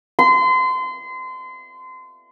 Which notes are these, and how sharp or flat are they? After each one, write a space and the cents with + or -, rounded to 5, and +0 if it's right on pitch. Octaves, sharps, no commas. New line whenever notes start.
C6 -30